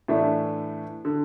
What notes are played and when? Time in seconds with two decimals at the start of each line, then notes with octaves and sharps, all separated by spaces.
0.08 A2 E3 A3 D4
1.05 D3